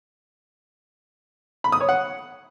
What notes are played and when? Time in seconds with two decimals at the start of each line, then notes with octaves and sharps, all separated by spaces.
1.64 B5
1.72 D#6
1.81 C#5
1.89 F#5